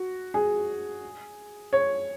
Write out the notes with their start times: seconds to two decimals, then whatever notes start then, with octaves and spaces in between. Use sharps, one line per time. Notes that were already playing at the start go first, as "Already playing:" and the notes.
Already playing: F#4
0.34 G#4
1.73 C#5